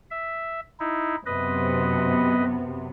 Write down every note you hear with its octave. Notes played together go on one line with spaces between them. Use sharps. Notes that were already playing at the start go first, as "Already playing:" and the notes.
E5
D#4 E4
F#2 C3 B3 B4 D#5